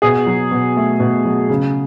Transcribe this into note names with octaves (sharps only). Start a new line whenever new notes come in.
B2 G#4
F#3
B2
A3
B2
F#3
C#3